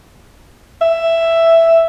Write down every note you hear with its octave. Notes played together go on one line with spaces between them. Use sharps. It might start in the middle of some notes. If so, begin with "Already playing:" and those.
E5